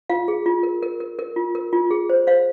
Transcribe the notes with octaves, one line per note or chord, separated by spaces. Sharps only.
F4 F5
G#4
F4
A#4
A#4
A#4
A#4
F4
A#4
F4
G#4
C5
C5 F5